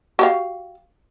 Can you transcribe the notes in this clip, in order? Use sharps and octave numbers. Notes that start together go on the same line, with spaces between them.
F#4 G4 F5